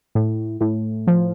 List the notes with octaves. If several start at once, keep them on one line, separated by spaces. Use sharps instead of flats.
A2
A2
F3